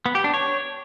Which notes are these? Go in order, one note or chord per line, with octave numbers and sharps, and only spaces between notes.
B3
G4
D4
C#5